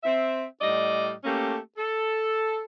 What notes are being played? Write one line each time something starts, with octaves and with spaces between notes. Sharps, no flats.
C4 E5
A2 G3 D5 D#5
A3 A#3 C#4 G4 A4
A4